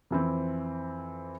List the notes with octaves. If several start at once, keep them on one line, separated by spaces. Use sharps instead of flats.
F2 E3 C4